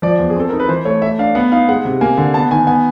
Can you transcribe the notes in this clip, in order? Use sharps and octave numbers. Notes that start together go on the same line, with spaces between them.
F3 D5
E2
G#4
C4 A4
D#4 A#4
B4
E3 C5
A3 C#5
A3 E5
D4 F5
B3 F#5
D#4 F5
G#3 F#5
C3
A#3 G#5
D3
B3 A5
D#3 G#5
B3 G#5